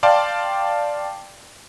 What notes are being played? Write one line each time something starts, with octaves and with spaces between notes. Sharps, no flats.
D5 F5 G5 A5 C6